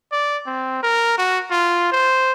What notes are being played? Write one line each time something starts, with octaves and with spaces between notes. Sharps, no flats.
D5
C4
A#4
F#4
F4
C5